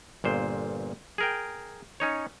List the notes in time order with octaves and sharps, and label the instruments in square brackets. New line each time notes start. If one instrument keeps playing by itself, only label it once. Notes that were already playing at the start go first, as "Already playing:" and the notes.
[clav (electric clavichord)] G1 A#2 C5
G#4 A#4 G5
C#4 D#4 C#5